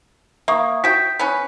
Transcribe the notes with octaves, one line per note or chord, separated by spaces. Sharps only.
A#3 E5 C#6 D#6
F#4 G5 B6
B3 C#4 B4